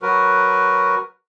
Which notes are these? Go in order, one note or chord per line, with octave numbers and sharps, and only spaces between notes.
F#3 F#4 A#4 B4